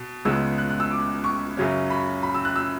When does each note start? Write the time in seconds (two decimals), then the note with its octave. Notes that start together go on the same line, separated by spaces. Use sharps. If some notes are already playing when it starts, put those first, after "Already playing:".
Already playing: B2
0.25 C#2 C#3 G#3 B3 E6
0.58 F#6
0.70 F#6
0.80 E6
0.91 D6
1.24 C#6
1.57 F#2 C#3 F#3 C#4
1.90 B5
2.23 B5
2.34 E6
2.45 F#6
2.56 E6